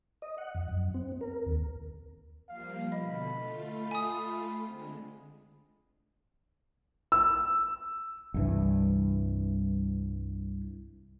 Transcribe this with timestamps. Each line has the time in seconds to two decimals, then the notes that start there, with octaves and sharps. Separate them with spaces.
0.22 D#5
0.38 F#5
0.55 F2
0.69 F#2
0.94 C4
1.21 A#4
1.46 D#2
2.49 F3 G3 A#3 F5
2.92 B2 D3 D#5 B5
3.32 A3 F4
3.91 G#5 D#6
4.67 D3 G#3 C4
7.12 E6
8.34 C2 G2 E3